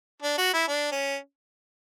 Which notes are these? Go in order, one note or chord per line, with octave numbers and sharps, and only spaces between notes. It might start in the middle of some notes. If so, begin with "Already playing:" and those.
D4
F#4
E4
D4
C#4